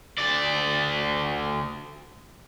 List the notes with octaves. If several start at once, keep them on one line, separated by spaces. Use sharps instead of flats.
D2 D5